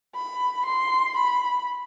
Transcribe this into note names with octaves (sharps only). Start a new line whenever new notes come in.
B5
C6
B5